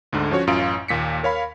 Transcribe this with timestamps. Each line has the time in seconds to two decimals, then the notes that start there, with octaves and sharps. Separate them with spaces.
0.13 D2 G#2 D3
0.31 F3 C#4 F#4 C#5
0.47 A1 F#2 F4 F5 D7
0.88 D#2 A#2 B6 C#7
1.23 A#4 C#5 F5 B5